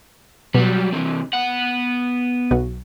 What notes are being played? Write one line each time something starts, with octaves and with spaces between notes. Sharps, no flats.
B2 F#3 G3
C3 E3
B3 F#5
B1 F#4